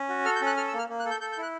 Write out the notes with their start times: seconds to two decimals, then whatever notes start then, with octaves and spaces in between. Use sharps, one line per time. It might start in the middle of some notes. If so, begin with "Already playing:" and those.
Already playing: C#4
0.09 F#4
0.25 A4 F6
0.36 G6
0.41 C#4
0.46 F#6
0.57 A4 F6
0.68 E6
0.73 A#3
0.79 F6
0.89 A#3
1.00 F#6
1.05 A4
1.11 G6
1.21 A4 G6
1.32 G6
1.38 E4
1.43 F#6